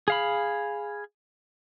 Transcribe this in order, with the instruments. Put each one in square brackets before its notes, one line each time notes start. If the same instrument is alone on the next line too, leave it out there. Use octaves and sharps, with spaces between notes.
[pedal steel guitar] G#4 F5 B5